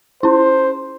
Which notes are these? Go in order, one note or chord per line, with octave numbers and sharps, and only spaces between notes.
C#4 E4 C5